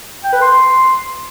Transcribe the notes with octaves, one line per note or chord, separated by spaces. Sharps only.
G5
B4
C6